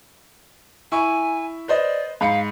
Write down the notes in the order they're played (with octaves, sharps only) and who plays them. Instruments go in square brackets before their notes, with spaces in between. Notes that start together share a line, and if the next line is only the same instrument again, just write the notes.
[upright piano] E4 C#6 [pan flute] G#5
[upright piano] B4 C5 D#5 [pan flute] D5
[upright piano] G#2 B5 C#7 [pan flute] F5